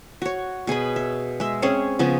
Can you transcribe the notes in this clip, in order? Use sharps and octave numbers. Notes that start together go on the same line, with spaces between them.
F#4 C#5
B2 G#4 G#5 B5
E5
G#3 E5
C4 C#4 G#4 C#5
C#3 F3 B3 C#4